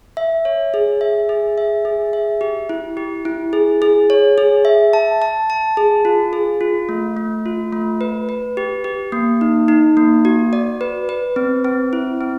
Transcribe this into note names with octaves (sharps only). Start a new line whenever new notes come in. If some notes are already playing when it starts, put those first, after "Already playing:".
E5
C#5
G#4
E5
G#4
E5
G#4
E5
G4
E4
G4
E4
G#4
G#4
C#5
G#4
E5
A5
A5
A5
G#4
F4
G#4
F4
A3
A3
F4
A3
B4
B4
G4
G4
A#3
D#4
D#4
A#3
F#4
D5
B4
B4
C4
C4
E4
C4